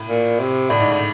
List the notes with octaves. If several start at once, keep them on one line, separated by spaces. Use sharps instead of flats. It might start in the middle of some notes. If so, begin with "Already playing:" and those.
Already playing: A2
A#2
C3
A2 D3
G#2
A2